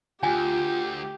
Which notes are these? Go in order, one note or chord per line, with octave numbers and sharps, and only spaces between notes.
D2 F4 G4 G#5